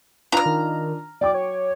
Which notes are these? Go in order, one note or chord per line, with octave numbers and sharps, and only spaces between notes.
D4 F4 A#5 F6
D#3
F#3 D5 G5 D6
C#5